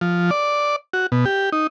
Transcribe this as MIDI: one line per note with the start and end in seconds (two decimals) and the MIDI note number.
0.01 0.31 53
0.31 0.76 74
0.93 1.07 66
1.12 1.25 47
1.25 1.50 67
1.52 1.67 63